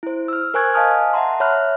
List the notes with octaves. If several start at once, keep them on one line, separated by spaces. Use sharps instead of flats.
E4 C5
E6 F6
A#4 C5 G#5 C#6 F#6 G#6
D#5 F5 G#5 A5 D#6 F6
E5 F#5 A5 A#5 C6
C#5 E5 B5 F6 F#6